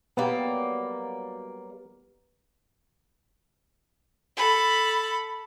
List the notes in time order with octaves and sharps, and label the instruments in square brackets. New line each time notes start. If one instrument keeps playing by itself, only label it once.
[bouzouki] F#3 G3 A#3 [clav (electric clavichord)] B3
[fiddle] A4 B5